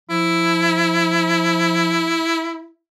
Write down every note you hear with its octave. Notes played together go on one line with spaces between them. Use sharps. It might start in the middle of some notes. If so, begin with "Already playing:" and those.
F3 E4